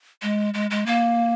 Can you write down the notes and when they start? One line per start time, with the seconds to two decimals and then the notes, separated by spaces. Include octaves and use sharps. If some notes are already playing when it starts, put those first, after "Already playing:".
0.22 G#3
0.54 G#3
0.71 G#3
0.86 A#3